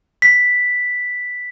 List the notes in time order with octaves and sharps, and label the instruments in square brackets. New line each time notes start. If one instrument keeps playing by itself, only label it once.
[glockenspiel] B6